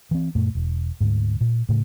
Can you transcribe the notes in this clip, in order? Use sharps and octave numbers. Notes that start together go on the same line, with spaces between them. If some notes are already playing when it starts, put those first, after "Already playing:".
E3 C4
F#2 A#2 A3
E1
D2 G#2
A#2
A2 C#3 A3